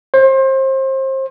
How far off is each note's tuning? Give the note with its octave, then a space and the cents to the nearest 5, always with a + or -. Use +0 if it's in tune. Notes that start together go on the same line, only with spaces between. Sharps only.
C5 +30